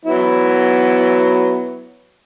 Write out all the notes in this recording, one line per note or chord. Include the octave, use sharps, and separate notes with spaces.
F#3 B3 E4